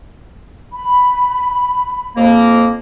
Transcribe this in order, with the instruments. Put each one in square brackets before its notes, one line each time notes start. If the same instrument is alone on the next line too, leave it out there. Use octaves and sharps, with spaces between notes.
[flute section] B5
[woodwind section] F2 A#3